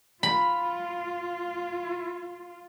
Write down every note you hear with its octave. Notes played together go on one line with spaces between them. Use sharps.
F4 B5